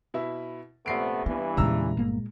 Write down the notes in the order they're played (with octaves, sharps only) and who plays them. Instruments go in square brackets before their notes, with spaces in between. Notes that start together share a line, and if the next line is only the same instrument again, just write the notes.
[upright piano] B2 E4 E5
[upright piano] A#1 C7 D7 [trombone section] C3 A3 B3
[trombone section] G2 E3 [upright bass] B3
[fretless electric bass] E2 C#3 [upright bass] A#2 G#3 [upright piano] A#5 E6
[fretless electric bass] G1 A#3